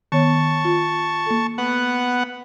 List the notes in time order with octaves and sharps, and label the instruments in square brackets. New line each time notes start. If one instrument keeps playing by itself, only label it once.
[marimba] D#3 B3 C#5 [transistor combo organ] A5 C#6
[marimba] F4
A#3 A4
[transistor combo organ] B3 F#5